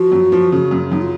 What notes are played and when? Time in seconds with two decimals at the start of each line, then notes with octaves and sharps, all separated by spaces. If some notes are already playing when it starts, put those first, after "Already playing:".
Already playing: F3 F#4
0.12 F#2
0.32 F3
0.52 C#3
0.71 F#2
0.92 F#2 D#4
1.02 F4